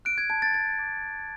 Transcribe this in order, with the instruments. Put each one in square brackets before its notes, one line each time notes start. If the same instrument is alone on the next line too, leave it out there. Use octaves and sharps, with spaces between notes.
[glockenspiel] F#6 D7
G#6
A5 G#6
A6
A5 A6
D6